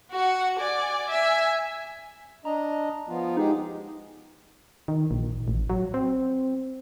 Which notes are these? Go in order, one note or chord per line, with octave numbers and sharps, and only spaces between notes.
F#4 F#5
D5 G#5
E5 G#5
D4 D#5 A#5
F3 B3 F4
G#3 D#4 G4 G#4
D#3
A#1
A1
F#3
C4